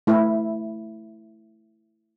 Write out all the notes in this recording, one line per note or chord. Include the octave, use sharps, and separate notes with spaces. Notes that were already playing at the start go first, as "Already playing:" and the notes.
A3 E4